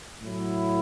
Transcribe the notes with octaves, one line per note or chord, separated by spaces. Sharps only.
A2 F#3 E4